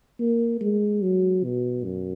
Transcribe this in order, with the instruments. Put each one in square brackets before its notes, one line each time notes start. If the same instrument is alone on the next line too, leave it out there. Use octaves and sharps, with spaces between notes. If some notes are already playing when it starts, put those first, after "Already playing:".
[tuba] A#3
G#3
F#3
B2
F#2